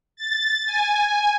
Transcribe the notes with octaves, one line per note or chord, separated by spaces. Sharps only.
A6
G#5